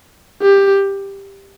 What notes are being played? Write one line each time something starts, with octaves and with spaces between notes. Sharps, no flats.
G4